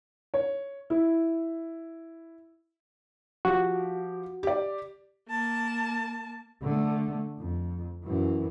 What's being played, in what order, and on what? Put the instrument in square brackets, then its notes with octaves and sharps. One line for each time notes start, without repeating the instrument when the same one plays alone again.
[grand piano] C#5
E4
[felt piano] F3 G4 [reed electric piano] F#4
[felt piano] G4 D5
[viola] A#3 A5
[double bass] D3 A3
F2
F#2 E3